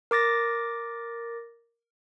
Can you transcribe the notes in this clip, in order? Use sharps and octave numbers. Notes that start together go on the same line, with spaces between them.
A#4 D6 A6 A#6